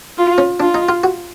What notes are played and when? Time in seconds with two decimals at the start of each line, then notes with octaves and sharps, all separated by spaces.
0.18 F4
0.38 C#4
0.60 D4 F4
0.74 D#4
0.89 F4
1.04 F#4